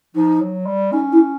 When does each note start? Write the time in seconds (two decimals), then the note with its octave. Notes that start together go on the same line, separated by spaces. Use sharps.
0.15 F3 D#4
0.41 F#3
0.66 G3
0.92 C#4 D#4
1.12 E4